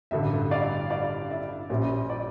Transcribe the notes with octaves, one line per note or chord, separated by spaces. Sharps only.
A1 G2 D3 G3 E5
D5 F5
D5 F5
E5
A#1 A#2 G3 C#4 E5
D5